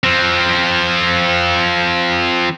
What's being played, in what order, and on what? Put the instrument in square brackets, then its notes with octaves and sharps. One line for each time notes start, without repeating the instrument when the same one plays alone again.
[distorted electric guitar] F3 C4